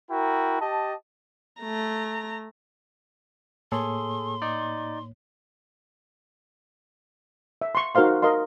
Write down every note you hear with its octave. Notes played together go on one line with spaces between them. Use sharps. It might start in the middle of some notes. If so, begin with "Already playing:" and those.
E4 F#4 A#4 G5
G4 D#5 A5
A3 A#5
A2 A#3 G#4 A4 C#5 C6
D#4 D5
E5
C6 C#6
D#4 F#4 A#4 C5 F5 C6
A#4 D#5 F5 C6